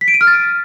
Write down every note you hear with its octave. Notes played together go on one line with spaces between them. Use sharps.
B6
D7
D#7
F6
A6